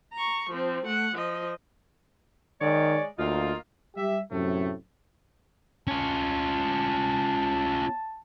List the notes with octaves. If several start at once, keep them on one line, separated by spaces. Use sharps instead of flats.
A#5 C#6
F3 C4
A3 F#5
F3 D#5
D#3 G#3 C#5 D5
D2 A#3 D#4 F4
G3 G4 E5
F#2 A2 C3 A3
C#4 F4 A5